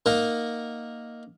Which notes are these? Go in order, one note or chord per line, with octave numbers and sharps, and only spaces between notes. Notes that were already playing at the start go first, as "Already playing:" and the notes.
A#3 D#4 A#4 F#5